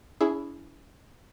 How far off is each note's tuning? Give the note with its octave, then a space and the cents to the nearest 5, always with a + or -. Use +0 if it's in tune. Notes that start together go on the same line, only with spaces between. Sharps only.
C#4 +45 E4 +0 G#4 +0